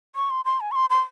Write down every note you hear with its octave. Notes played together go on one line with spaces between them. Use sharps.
C#6
C6
C6
G#5
C#6
C6
C6